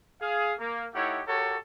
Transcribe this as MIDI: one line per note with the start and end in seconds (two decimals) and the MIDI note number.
0.22 0.54 68
0.22 0.54 77
0.59 0.86 58
0.95 1.21 57
0.95 1.21 63
0.95 1.21 64
0.95 1.21 67
0.95 1.21 73
0.95 1.21 78
1.27 1.57 66
1.27 1.57 67
1.27 1.57 69
1.27 1.57 70
1.27 1.57 73